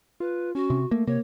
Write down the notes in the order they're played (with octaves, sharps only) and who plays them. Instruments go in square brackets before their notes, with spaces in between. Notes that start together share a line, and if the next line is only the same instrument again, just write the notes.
[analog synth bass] F4 [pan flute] B4
[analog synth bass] C#4 [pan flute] F#4
[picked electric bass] C3
[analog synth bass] A3 [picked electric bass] A#3
[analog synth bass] C3 [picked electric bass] A#3 [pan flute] C#5